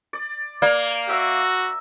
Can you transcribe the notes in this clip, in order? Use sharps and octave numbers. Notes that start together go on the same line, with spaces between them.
D5
A#3 D5 F5
F#4 E5 E6